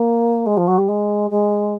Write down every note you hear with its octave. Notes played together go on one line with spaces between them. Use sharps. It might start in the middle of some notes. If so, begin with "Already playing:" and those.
Already playing: A#3
G#3
F3
F#3
G3
G#3
G#3